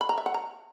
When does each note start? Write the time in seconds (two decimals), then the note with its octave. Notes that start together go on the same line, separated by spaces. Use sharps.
0.01 B5
0.09 A#5
0.18 E5
0.26 F#5
0.34 A#5